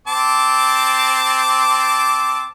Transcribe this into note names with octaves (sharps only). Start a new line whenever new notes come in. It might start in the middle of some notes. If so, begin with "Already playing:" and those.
C4 A5 D6